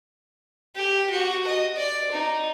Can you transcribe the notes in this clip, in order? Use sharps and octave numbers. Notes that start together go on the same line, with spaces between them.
G4
F#4
D#5
D5
D#4